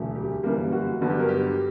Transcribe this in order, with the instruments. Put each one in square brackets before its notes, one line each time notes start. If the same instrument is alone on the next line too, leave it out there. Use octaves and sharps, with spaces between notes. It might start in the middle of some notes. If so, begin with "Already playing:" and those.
Already playing: [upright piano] E1 D2 C#3 F#3
G4
G1 F#2 E3 G3 A#3
F#4
G1 G2 F#3 B3
G4
A#4
G4